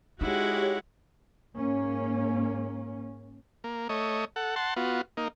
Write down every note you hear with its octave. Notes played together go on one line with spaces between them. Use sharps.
G#3 D#4 E4 F#4 G4 C#5 F#5
G#2 A#3 C#4
A#3
A3 C#5 D#5
A4 F#5
F#5 A5 C6
B3 F4 F#4
A#3 D#4